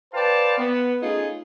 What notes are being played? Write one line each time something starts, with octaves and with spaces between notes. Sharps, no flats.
B4 C5 D5 F5 G5 A5
B3
A3 C#4 D#4 F4 G#4